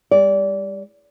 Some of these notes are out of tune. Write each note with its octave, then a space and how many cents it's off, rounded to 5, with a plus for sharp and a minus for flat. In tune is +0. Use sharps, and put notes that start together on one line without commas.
G3 +35 D5 -25